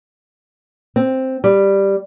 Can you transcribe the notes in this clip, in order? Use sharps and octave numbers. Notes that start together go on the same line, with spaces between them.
C4
G3